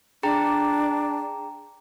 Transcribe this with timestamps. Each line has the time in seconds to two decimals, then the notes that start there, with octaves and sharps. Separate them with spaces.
0.23 D4 G#4 G5 A#5